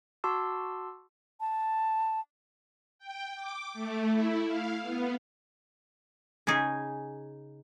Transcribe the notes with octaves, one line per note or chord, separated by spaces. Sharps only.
F#4 A5 C6 D6 E6
A5
G5
D6
A3
E4
F5
B3
C#3 C#4 D#4 G#4